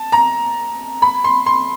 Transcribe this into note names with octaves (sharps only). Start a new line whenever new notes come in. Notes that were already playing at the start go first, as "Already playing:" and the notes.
Already playing: A5
A#5
B5
C6
C6